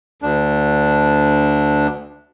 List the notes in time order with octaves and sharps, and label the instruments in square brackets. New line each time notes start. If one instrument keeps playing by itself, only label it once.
[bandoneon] D2 D4